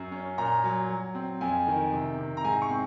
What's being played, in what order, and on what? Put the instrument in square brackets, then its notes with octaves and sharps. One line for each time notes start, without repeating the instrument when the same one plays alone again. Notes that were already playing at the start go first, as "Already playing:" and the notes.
Already playing: [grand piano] F#2
C#4
A#2 A#5
F#3
F#3
C4
F2 G#5
D#3
C3
C3
A#5
G#2 G#5
C#6
C4